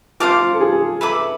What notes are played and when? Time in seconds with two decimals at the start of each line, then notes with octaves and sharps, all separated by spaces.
0.20 F4 C5 F5 A5 D6
0.40 F4
0.53 A4
0.60 G#4
1.01 A4 B4 E5 B5 D6